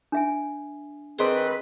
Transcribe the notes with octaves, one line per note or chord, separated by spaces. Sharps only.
D4 E5 G#5
D#3 C4 G#4 B4 C5 D5